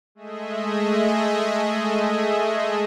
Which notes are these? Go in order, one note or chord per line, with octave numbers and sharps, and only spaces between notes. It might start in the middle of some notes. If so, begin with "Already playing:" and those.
G#3 A3 G#4 D#5 E5